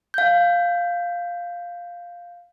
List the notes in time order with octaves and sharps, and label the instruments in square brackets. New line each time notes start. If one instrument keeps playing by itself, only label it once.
[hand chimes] F5 G6